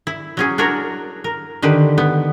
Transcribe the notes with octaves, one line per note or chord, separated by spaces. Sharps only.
E4
F#3 C#4 G#4
D4 F#4 A#4 C#5
A#4
D3 D#3 G4 B4
B3